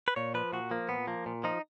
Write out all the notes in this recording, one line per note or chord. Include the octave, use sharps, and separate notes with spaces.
B4
A#2 C#5
F3 B4
A#2 F#4
F3 A#3
A#2 B3
F3 A#3
A#2
F3 D#4